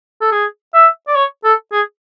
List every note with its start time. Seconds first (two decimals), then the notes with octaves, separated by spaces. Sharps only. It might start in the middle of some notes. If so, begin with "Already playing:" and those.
0.21 A4
0.32 G#4
0.74 E5
1.08 D5
1.16 C#5
1.44 A4
1.72 G#4